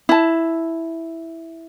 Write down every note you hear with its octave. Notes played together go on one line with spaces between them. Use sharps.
E4 A5